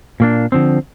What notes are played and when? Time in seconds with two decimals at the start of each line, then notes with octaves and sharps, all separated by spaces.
0.20 A#2 A#3 D4
0.52 D3 F3 C4